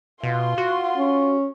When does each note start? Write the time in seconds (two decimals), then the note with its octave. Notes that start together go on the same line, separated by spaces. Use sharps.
0.23 B2 F4 C6
0.58 F#4
0.97 C#4